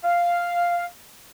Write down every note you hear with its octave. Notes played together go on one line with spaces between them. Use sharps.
F5